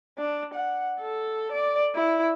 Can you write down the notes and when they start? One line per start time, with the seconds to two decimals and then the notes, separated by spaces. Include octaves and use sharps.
0.18 D4
0.54 F#5
1.00 A4
1.53 D5
1.95 E4